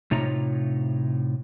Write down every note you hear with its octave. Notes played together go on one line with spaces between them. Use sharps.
A2 C3 D#4 F4 C#5 A#5